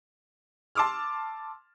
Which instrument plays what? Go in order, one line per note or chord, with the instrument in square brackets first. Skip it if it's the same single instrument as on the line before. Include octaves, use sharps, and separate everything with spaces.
[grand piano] A5 C6 D6 E6 F6